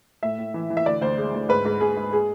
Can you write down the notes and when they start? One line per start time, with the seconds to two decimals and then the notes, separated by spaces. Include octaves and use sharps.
0.23 A2 E5
0.39 A2
0.54 E3
0.70 E3
0.77 E5
0.86 D2 D5
1.01 D2 C5
1.17 G#3
1.34 D2
1.49 G#2 B4
1.65 G#2
1.81 G#2 G#4
1.97 G#2
2.13 G#3 G#4